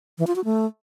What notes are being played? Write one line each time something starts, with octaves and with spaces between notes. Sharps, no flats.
E3
F4
F#4
A3